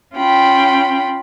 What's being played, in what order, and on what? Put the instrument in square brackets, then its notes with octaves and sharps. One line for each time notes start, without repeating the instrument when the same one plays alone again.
[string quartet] C#4 F4 G5 B5